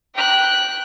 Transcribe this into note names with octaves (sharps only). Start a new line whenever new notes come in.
G5 F#6